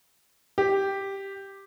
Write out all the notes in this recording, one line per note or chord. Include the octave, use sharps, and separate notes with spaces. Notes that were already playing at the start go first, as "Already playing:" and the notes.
G4